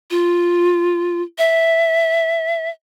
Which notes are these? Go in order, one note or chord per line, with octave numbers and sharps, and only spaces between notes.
F4
E5